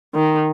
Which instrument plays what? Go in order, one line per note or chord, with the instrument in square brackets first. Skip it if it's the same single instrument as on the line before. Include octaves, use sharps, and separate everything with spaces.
[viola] D#3